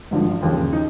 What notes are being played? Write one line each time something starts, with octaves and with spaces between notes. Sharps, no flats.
G#1 G2 D3 F3
D#2 C#3 F3
D#4